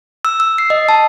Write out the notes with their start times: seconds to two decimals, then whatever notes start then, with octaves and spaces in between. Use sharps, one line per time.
0.25 E6
0.40 E6
0.58 C7
0.70 D#5
0.89 A5